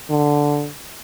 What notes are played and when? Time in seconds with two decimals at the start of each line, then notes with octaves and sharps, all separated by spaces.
0.10 D3